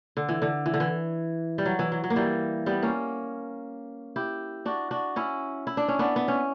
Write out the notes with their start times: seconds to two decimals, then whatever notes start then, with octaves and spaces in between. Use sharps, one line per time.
0.17 D3
0.29 E3
0.42 D3
0.66 E3
0.74 D3
0.80 E3
1.58 G3
1.66 F#3
1.79 E3
1.92 F#3
2.04 F#3
2.10 A#3
2.16 E3 G3
2.66 G3 B3
2.83 A#3 C#4
4.16 E4 G4
4.66 D4 F#4
4.91 D4 F#4
5.16 C#4 E4
5.67 E4
5.77 D4
5.88 C#4
5.99 B3 D4
6.16 B3
6.28 C#4